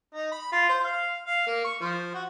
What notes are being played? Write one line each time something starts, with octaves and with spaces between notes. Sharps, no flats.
D#4
B5
F4
C5
F5
F5
A#3
C#6
F3
F#4